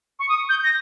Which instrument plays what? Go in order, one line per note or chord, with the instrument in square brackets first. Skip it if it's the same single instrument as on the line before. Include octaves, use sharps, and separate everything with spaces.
[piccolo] C#6
D#6
G6
A#6